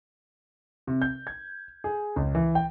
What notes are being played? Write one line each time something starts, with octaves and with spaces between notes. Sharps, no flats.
C3
G6
G#6
G#4
C#2
E3
G5